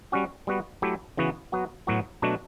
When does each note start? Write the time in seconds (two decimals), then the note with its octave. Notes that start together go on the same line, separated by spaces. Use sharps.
0.12 G3 C#4 F#4
0.47 G3 B3 F#4
0.82 F#3 A3 E4 G4
1.17 C#3 E3 B3 F#4
1.52 F#3 B3 F#4
1.87 A2 F#3 B3 F#4
2.22 B2 F#3 A3 D4 F#4